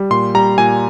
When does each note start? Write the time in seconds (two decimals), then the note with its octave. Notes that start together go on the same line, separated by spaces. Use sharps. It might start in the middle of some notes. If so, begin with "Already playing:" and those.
Already playing: G3
0.11 A#2 C6
0.35 G3 A#5
0.58 A#2 G#5